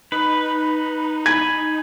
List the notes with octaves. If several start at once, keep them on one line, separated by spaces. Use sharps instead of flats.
D#4 B4
G#5 B5 G#6